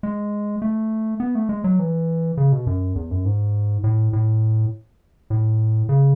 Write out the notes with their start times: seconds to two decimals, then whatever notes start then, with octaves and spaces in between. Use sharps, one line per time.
0.03 G#3
0.62 A3
1.20 B3
1.35 A3
1.49 G#3
1.64 F#3
1.79 E3
2.37 C#3
2.52 B2
2.67 F#2
2.96 E2
3.11 F#2
3.25 G#2
3.84 A2
4.13 A2
5.30 A2
5.89 C#3